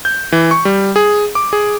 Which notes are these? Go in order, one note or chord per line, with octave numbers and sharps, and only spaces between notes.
G6
E3
C#6
G3
G#4
D6
G#4